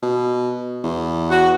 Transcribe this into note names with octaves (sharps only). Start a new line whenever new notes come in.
B2
E2
F#4